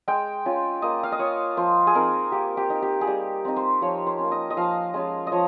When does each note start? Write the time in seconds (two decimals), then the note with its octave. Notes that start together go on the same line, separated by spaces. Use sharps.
0.08 G#3 G5
0.45 C#4 F4
0.82 A#3 D#5
1.03 F5
1.12 D#5
1.19 F4 C#5
1.57 F3 C5
1.87 G#4
1.94 C4 D#4 A#4
2.32 A#3 G4
2.57 G4
2.70 D#4
2.82 G4
3.01 G#4
3.07 G3 G4
3.45 C4 D#4
3.56 C5
3.81 F3 C#5
4.07 C5
4.19 C#4
4.24 A#3
4.32 D#5
4.50 D#5
4.57 F3 F5
4.94 G#3 C#4 F4
5.27 D#5
5.32 F3 C#5